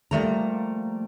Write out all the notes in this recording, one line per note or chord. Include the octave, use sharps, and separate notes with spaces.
F3 G3 A3 A#3 A#5